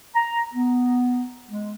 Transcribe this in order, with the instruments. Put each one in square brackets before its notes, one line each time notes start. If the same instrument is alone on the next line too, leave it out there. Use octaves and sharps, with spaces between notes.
[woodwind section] A#5
B3
G#3